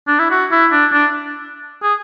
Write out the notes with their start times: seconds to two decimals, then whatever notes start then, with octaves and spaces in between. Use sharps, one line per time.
0.07 D4
0.19 E4
0.31 F#4
0.51 E4
0.72 D4
0.92 D4
1.83 G#4